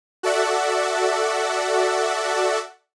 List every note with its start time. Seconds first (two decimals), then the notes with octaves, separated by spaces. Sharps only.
0.23 F#4 A4 D5 E5 F#5